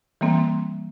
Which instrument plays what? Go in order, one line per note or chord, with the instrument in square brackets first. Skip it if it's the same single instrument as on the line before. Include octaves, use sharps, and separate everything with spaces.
[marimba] E3 G3 A#3 C4